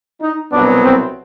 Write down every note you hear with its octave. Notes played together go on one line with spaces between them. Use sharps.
D#4
C2 B2 F#3 B3 D4
C4